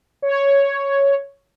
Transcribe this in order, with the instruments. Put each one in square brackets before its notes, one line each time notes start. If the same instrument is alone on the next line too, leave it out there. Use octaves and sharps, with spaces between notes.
[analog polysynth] C#5